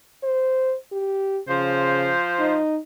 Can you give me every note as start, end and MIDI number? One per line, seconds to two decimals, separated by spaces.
0.23 0.75 72
0.92 1.40 67
1.48 2.13 49
1.48 2.56 53
1.48 2.56 72
2.40 2.79 63